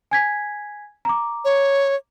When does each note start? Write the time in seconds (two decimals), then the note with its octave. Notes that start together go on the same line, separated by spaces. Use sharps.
0.11 G#5 G#6 B6
1.05 A#5 D6
1.45 C#5